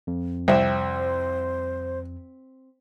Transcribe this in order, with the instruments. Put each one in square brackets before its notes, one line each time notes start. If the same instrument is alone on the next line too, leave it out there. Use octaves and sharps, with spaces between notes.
[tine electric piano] F2
[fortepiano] C2 [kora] C4 E5 [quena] C5